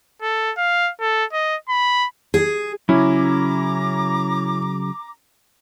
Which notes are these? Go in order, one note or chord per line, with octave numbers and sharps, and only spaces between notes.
A4
F5
A4
D#5
B5
G#4
C#3 F#3 C#4 E4 A#5 D6